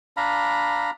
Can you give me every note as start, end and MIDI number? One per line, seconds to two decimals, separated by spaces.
0.17 0.90 62
0.17 0.90 77
0.17 0.90 82
0.17 0.90 83